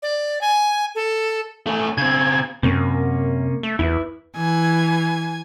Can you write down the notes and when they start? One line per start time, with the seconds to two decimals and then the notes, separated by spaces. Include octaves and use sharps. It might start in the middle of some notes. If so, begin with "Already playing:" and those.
0.03 D5
0.41 G#5
0.95 A4
1.67 A3 C#4
1.98 C#3 C4 G#6
2.63 F#2 C3 A#3 C#4
3.63 A3
3.79 E2 E4 B4
4.36 E3 G#5